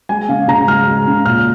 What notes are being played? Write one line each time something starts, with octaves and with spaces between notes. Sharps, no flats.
G#3 G#5
C#3 F5
C#3 A#5
G#3 F6
G#3
C#3
A#2 F6